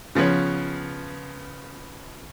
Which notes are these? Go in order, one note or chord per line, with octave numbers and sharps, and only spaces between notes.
C#3 F3 B3 B4 C#5